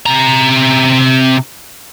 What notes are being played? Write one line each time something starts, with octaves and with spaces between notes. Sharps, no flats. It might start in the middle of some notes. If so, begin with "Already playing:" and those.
C3 A#5